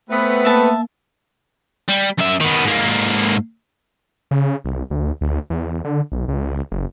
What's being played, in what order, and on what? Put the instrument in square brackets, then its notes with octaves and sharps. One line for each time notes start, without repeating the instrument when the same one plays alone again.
[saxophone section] A3 B3 [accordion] C4 B4
[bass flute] A#3 [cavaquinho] E5 A5
[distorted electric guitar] G3
F#2 E5
D#3 B3
G#2 A#3
[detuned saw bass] C#3
C2
D2
D2
E2
D3
B1
C#2
F#1